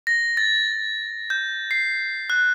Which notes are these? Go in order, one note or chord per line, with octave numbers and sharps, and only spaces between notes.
A#6
A6
G6
C7
F#6